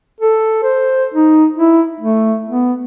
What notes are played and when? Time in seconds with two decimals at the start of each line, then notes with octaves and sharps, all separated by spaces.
0.21 A4
0.63 C5
1.14 D#4
1.56 E4
2.00 A3
2.49 B3